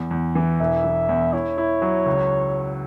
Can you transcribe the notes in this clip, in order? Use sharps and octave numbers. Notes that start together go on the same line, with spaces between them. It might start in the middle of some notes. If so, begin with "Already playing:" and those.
Already playing: E2
E2
E3
E1 E5
E3
E2
E4 C#5
E4
F#3
C#2